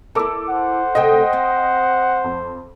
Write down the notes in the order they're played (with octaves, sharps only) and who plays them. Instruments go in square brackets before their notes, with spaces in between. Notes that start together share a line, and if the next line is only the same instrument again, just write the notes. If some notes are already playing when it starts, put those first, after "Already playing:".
[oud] E4 A#4 [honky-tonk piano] A4 D6 E6
[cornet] C5 [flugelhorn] F#5
[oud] D2 C3 A4 [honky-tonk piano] D#5 G5
[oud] C4
[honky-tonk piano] F2